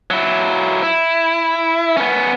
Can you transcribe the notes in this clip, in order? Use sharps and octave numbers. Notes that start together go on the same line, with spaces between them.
F#3 E4
E4
B3 C#4